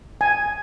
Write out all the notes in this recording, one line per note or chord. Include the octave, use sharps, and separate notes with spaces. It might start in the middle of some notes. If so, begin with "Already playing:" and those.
G#5